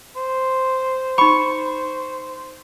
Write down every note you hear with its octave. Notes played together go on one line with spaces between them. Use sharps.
C5
D#4 B5 C#6